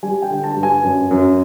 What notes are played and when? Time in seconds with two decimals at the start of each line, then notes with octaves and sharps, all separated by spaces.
0.03 G3 G#5
0.22 G5
0.30 D3
0.44 A5
0.56 G2
0.63 G#5
0.83 F#2
1.11 F#2